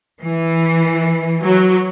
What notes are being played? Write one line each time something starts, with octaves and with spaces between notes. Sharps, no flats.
E3
F#3